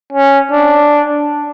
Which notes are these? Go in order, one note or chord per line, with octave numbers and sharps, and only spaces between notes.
C#4
D4